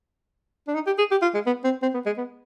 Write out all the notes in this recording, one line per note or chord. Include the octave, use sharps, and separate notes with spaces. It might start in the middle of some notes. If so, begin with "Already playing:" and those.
D4
D#4
G4
G#4
G4
F4
G#3
B3
C4
C4
B3
G#3
B3